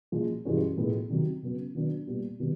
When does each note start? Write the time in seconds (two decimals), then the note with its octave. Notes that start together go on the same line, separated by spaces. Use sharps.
0.12 A#2 F3 G#3
0.45 G2 E3 G#3 C#4 F#4
0.77 A2 F3 G#3 B3
1.10 C3 D#3 F#3
1.43 C#3 F#3 B3
1.75 D#3 F#3 B3 D4
2.07 A#2 G3 B3
2.40 C3 D#3 G3 B3